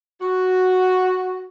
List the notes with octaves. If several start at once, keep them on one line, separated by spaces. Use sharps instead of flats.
F#4